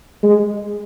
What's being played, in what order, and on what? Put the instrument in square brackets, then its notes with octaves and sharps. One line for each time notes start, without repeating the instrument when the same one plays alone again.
[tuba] G#3